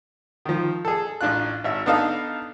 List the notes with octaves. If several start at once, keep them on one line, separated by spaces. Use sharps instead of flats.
D#3 F3
G#4 A4
A1 D4 F4 F#6
G#1 E5
B3 D4 D#4 A4 F5